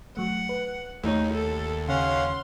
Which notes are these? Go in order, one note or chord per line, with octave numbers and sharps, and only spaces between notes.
F#3 A3 F#5
B4
D#2 A3 D#4 C#5
A4
C#3 C#4 F5 F#5 C6